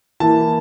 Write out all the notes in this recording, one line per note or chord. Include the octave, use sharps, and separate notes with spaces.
E3 A#3 E4 A5